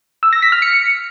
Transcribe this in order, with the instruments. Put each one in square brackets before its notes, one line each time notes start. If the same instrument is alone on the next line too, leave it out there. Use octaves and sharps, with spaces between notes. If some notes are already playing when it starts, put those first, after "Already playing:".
[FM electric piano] E6
A#6
B6
F6
C#7